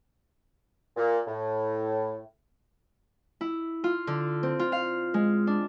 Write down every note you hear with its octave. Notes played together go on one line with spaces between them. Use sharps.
A#2
A2
E4
F4
D3
C4
F4
F5
G#3
D4